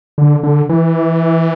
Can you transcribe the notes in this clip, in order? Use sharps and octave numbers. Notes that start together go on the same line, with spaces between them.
D3
D3
E3